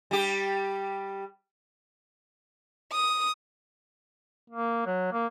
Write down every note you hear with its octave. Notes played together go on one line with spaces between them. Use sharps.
G3 G4
D#6
A#3
F#3
A#3